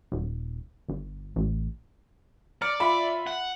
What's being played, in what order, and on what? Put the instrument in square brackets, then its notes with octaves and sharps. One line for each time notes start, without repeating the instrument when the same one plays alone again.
[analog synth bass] D#1
G1
A1
[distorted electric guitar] D5 [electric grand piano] A#5 F6 C#7
[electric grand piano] F4 E5 [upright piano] B5
[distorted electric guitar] F#5